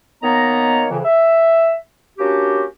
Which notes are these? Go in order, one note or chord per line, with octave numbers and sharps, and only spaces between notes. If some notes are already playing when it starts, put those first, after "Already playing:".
D#3 A#3 B3 C#5 D#5 A#5
F2 C#3 E3
E5
A#3 C#4 D4 F#4 G4